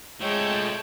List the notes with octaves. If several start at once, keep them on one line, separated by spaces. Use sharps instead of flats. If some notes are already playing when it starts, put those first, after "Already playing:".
F3 G#3 A3 C#5 G5 A5